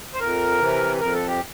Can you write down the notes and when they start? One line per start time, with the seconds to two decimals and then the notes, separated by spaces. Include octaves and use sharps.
0.14 C5
0.20 F2 A#4
0.60 C3 E3
1.00 F2 A#4
1.13 A4
1.28 G4